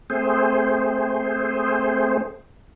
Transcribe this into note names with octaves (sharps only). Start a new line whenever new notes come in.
A3 C4 G#4 C5